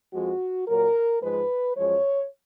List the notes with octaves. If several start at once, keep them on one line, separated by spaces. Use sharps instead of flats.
F2 F3 G#3 F#4
A#2 F#3 A#4
G#2 F3 G#3 B4
F#2 F3 G#3 C#5